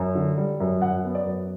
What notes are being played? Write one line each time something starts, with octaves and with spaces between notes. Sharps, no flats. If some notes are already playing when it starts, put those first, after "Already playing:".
Already playing: F#2
D3
G3
F#2
F#2 F#5
B3
D5
F#2